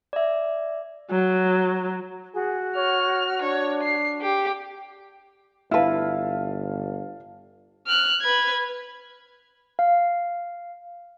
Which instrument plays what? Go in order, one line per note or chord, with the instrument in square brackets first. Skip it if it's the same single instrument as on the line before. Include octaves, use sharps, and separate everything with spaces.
[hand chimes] D5 E5
[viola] F#3
[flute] F#4 [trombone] G#4
[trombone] C#5 [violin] F6
[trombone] D4 [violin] C#5
[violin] C7
G4
[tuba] G1 [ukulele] E4 B4 [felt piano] F5 A5
[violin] F6 F#6
B4 G#6
[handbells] F5